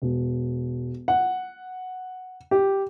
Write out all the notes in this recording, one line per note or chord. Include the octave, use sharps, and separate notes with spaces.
E1
F#5
G4